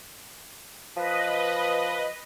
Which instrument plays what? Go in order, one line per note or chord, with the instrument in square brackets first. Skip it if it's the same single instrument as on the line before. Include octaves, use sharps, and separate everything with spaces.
[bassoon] F3 [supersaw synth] B4 D#5